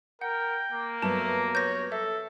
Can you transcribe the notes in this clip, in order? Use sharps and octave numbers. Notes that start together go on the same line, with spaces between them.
A#4 F#5 G5
A#3
G2 F#3 A3 B3 A5
C#5 G6 A#6
A4 E5